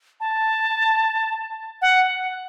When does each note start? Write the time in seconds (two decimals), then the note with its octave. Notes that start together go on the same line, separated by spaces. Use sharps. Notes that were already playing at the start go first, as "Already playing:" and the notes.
0.20 A5
1.82 F#5